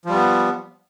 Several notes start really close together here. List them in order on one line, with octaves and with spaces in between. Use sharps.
F3 G3 B3